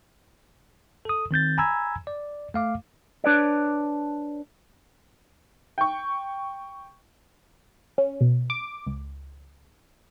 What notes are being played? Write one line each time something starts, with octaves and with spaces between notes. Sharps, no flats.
A4 D#6
D#3 C4 G6 A6
G#5 A#5 B5 E6 G#6
D5
A3 F5 D6
D4 B4 C#5 D5
G5 C#6
C#4
B2
D6
C#2